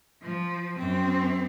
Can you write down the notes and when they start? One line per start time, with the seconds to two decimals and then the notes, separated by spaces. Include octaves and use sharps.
0.22 F3
0.78 F#2 C4